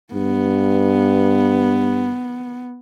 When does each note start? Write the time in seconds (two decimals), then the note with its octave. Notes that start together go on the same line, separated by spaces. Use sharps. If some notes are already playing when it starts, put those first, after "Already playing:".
0.14 G2 B3